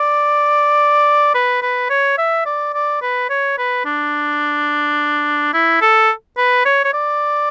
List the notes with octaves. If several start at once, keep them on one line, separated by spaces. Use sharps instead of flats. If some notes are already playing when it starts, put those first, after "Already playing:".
Already playing: D5
B4
B4
C#5
E5
D5
D5
B4
C#5
B4
D4
E4
A4
B4
C#5
C#5
D5